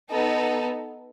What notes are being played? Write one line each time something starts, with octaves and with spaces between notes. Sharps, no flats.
B3 D#4 A4